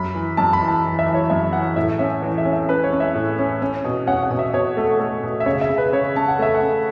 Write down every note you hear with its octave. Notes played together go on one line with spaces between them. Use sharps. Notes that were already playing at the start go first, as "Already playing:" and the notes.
Already playing: F#2 B5
E3
F#2 A5
B5
E3
A5
E3
E5
E3
C#5
F#2 E5
E3 F#5
A2 E5
C#4 E5
E3 C#5
E5
C#4
E5
C#4 B4
C#5
C#4
E5
A2
C#4
C#4
B2
C#4 F#5
F#5
B2
E5
B2 C#5
A3
A3
B2
E5
C#3 C#5
E5
C#3
B4
C#3 C#5
C#3 A5
F#5
A3 E5
F#5
C#4